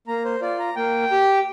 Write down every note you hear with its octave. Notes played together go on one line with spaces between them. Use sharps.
A#3 A#5
C5
F4 D5
A#5
A#3 G5
G4